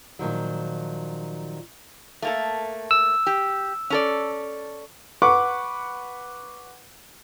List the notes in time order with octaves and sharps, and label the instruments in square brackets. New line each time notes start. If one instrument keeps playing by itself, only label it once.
[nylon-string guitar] A#2 D#3 F3 F#3
[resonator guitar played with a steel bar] A3 A#3 A4
[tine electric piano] E6
[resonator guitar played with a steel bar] G4
C#4 A4 D5
[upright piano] B4 F#5 C#6 D6